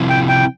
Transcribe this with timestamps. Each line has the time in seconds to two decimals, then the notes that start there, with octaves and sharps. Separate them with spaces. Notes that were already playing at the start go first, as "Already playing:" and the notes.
Already playing: C3 F3 C4 E4
0.10 G5
0.29 G5